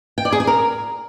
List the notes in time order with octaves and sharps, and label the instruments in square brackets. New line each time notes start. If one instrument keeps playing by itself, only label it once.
[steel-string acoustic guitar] G5
D5
G#4
G#5
A#4